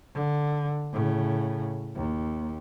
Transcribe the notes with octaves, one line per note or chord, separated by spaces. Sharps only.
D3
A2 C#3
D#2